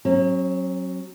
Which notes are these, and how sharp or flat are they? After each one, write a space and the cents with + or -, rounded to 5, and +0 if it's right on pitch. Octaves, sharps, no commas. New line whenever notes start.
F#3 +0 C#4 -45